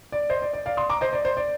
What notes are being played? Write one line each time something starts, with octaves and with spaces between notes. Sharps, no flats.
D5
C5 D#5
D5
D5
D5 F5
C6 D#6
A#5 D6
C5 D#5
D5
C5
D5